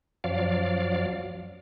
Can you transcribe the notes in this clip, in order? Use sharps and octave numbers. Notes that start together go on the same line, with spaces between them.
F#2 F3 F#3 D5 F5